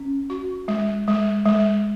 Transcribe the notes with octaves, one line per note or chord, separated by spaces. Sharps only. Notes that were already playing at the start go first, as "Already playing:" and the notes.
Already playing: C#4
F#4
G#3
G#3
G#3